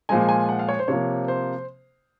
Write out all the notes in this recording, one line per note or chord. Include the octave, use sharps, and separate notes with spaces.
A#2 F3 G#3 G#5
G#5
F#5
F5
C#5
C5
C3 F3 A#3 C#5
C5